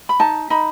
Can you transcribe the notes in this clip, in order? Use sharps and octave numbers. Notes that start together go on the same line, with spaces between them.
B5
D#4 A5
D#4 B5